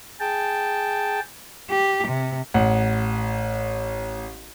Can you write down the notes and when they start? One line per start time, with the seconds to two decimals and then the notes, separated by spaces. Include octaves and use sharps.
0.20 G#4 G5 A5
1.71 G4
2.08 C3
2.54 A1 F#5